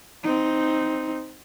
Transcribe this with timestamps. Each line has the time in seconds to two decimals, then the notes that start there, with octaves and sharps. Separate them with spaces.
0.23 C4 D#4